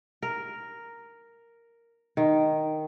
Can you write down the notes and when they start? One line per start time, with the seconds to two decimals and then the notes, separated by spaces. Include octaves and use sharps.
0.23 A#4
2.17 D#3